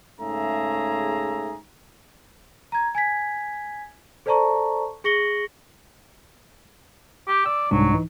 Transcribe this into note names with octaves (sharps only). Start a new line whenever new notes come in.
G#2 C#3 A3 G#4 E5 A#5
A#5 G#6
G#5 G#6 B6
A4 C5 D5 A5 A#5 C#6
G#4 C#6 A#6 C#7 F#7 G7
G4
D5 E6
C2 G#2 F#3 D4
E3 D#4